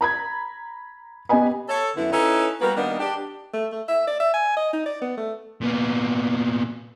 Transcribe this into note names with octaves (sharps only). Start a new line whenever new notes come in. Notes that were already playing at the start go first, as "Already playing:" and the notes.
A#5 B5 G#6
B3 G4 D#5 G#5 B5
A4 C#5
F#2 D3 B3 E4
C#4 D#4 E4 A4 B4 C#5
G3 A#3 B3 F#4 A#4 B4
D#3 G3 A#3 B3 D4 D#4
D4 G4
A3
A3
E5
D5
E5
G#5
D#5
D#4
D5
B3
A3
A#2 B3